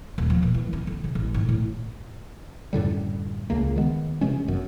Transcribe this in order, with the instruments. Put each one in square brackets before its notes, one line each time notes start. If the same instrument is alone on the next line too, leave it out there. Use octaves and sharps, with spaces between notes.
[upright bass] D#1
F3
A#2
E3
C#4
D3
C#3
A1
G#2
A2
[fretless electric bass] F#2 A2 D3 G3
C#2 C#3 A#3
D#3 G#3 B3
C3 E3 G#3 C#4
G1 F#2